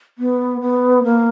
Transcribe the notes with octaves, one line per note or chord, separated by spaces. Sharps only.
B3
B3
A#3